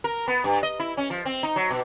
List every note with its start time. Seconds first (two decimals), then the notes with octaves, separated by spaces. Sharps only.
0.04 A#4
0.28 B3
0.44 G2
0.63 D#5
0.80 E4
0.97 C#4
1.10 F3
1.25 C4
1.43 D#4
1.56 F#3
1.70 B2